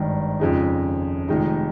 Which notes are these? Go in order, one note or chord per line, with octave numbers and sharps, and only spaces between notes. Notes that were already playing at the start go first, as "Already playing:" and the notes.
Already playing: G#1 G2 D#3
F2 C#3 G#3 D#4
F1 F2 D#3 G#3 D#4